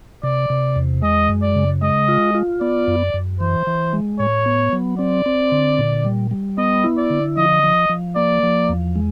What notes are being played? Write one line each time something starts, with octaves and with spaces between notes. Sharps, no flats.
C3 D5
C3
E2
G#3 D#5
F#2
D5
C#3
G#3 D#5
F4
F4
B3 D5
F#2
F#2
E3 C5
E3
G#3
A2 C#5
B3
F#3
C4 D5
C4
D3
A#2
G3
G3
B3 D#5
E4
D5
D3
F3 D#5
F3
F3
A#3 D5
F3
E2
G#3